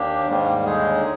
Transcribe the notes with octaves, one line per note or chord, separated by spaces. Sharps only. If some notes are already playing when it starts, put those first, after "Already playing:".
Already playing: D#2 A#3 D4 G4
G#2 D#3 G3 A#3
D#2 D3 G#3 D#4 G#4